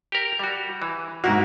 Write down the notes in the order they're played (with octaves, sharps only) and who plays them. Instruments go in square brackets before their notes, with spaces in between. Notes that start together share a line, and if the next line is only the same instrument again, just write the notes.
[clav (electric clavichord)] G4 A#4
G3 F#4
E3
[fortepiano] G#2 F#4 [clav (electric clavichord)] A#3 E4